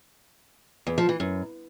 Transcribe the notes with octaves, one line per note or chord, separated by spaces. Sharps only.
E2
F3
E3
F#2